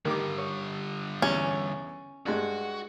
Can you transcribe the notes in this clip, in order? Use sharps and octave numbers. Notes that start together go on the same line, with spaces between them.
D3 D#3 G3 G4 D6
C#5
E2 C#4
G2 G#3 F#4